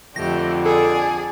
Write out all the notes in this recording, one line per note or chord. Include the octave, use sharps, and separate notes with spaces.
F2 D3 A3 G4 A#6
G#4 A4 D5